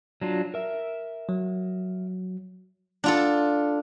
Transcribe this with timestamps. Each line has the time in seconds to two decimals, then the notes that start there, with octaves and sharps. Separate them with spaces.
0.21 F#3 D4 F4
0.54 A#4 E5
1.29 F#3
3.04 D4 F4 A4